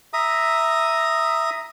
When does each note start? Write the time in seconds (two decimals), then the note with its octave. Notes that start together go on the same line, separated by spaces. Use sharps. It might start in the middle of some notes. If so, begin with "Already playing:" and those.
0.13 E5 A#5 D#6